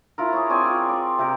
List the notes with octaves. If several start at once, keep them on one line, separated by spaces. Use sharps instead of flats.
E4 F4 A#4
G#4 C#5
C4 C#4 D5 G#5
F4
D5
C3 G4 A#4